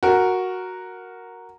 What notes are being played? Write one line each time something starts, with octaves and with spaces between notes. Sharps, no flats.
F#4 A#4